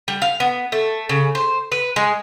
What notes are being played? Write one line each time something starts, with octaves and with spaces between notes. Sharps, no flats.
G3
F5
B3
A3
C#3
C5
B4
G#3